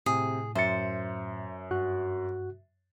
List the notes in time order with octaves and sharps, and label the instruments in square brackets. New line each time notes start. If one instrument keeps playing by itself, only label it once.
[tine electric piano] A2 [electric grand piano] C3 [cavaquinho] G#4
[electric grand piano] F#2 A6 [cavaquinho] C5 [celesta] E5 C#7
[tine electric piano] G2 F#4 F#6